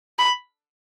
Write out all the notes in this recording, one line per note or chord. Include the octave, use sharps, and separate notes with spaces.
B5